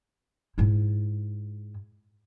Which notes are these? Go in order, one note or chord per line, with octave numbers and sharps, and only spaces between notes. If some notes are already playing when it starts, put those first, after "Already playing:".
G#2 E4